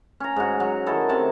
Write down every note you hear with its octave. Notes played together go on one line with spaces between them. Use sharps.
C#4 A#5
G#2 F#4
F#3
D#3 E4 A4
C3 A5